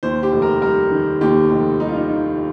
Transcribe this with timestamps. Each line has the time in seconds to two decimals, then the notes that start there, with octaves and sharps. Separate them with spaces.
0.03 D#2 C5
0.23 G4
0.32 F1
0.42 A#4
0.62 G3 A#4
0.91 D#3
1.21 D#2 G4
1.51 F1
1.80 G3 D#4
1.89 F4
1.97 D#4
2.10 D#3